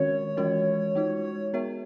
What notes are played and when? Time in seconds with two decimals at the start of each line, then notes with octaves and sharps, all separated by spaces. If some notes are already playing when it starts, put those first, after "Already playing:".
Already playing: D#3 G#3 C#4 F#4 A#4 C#5
0.37 E3 G#3 C#4 F#4 A#4
0.95 G#3 D#4 F#4
1.53 B3 F#4 A#4 C#5 E5